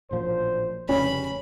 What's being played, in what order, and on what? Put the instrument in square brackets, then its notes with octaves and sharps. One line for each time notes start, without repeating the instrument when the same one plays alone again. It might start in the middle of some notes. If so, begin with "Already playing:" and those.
[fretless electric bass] A1 A#2 F3 [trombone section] F#3 D4 C5
[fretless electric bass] F1 C#3 [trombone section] G2 [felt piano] C#4 [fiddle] B5